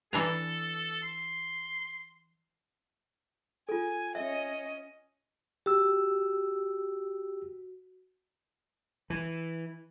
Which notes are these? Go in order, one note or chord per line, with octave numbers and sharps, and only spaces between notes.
E3 D4 A4 A#5
C6
F4 A4 G#5
C#4 D#5 E5
F#4 G4 E6
E3